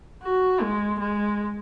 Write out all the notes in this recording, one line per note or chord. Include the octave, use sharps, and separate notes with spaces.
F#4
G#3
G#3